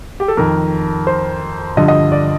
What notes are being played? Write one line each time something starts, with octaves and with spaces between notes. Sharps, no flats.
G4
A4
F2 D#3 A#4
C5
G2 D3 F3 D#5
D#5
D5